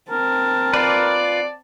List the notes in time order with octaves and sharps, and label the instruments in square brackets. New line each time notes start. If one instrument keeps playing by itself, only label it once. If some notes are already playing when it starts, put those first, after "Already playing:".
[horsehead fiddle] C4 A5 [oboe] A#4
[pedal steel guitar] F4 B4 [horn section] D5